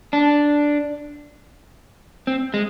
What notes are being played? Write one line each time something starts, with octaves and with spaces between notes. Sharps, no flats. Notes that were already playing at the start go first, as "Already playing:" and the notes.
D4
C4
G#3